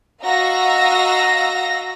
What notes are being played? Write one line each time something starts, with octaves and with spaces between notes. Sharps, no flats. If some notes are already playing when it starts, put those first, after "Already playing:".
F#4 D#5 F5 A#5 E6 A#6